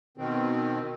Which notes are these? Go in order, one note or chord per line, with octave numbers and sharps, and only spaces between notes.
B2 D#3 C4